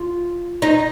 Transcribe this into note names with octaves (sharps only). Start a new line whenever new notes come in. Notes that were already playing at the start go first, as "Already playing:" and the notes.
Already playing: F4
D#4